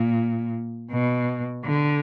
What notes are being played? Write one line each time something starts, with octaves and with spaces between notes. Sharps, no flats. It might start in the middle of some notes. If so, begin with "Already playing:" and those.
Already playing: A#2
B2
D3